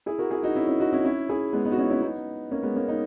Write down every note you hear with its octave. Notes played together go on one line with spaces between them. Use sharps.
E4 G#4
F#4 A#4
E4 G#4
D#4 F#4
C#4 E4
C#4 E4
D#4 F#4
C#4 E4
C#4 E4
E4 G#4
G#3 B3
B3 D#4
F#4
C#4 E4
D#4
C#4 E4
B3 D#4
A#3 C#4
G#3 B3
A#3 C#4
B3 D#4